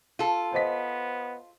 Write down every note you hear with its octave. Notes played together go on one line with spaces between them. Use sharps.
F4 A4
B3 C5 D#5 B6